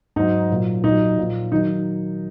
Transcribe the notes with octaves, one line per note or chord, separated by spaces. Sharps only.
G#2 F#3 D#4
A#2 F#3
A#2 F#3 D#4
A#2 F3
D#3 F#3 D#4